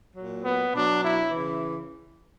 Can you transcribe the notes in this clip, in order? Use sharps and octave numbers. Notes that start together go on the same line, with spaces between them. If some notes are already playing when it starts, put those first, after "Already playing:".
A#2 F#3
B3
B2 F#3 D4
E4
C#3 E3